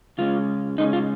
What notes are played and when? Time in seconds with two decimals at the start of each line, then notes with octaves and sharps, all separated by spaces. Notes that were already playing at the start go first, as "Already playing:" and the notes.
0.18 C#3 G#3 C#4 F4
0.78 C#3 G#3 C#4 D#4
0.93 F4